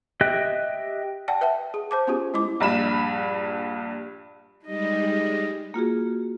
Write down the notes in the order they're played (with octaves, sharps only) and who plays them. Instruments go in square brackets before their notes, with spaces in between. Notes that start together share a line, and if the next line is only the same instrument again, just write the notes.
[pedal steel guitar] G4 D#5 E5 G5 F#6
[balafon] D5 F#5 G5 A5
B4 E5 F#5 A5
G#4
C5 A5 D6
B3 C#4 F4 G4 G#4
G#3 E4 D6
[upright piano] A#1 G2 B5 E7
[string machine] G3 G#3 [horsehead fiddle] D#4 D#5
[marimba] A#3 F4 F#4 G#4